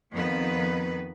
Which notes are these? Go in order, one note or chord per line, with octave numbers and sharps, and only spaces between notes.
F2 D#3 F3 B3 B4